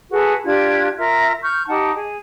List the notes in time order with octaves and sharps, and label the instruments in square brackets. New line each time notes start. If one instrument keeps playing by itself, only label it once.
[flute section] F#4 G#4 A4 B4
D4 F4 G4 G#6
F4 A#4 E5 A#5
C#6 F6 G6
D#4 G4 F#5 A5
G#4